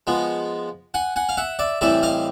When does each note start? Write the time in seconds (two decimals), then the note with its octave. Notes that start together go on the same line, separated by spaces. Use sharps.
0.07 F3 G#3 B3
0.94 F#5 G#5
1.16 F#5 G#5
1.29 F5
1.37 E5 F#5
1.59 D5 E5
1.81 A2 E3 G3 C4 E4 D5 E5
2.03 D#5 F5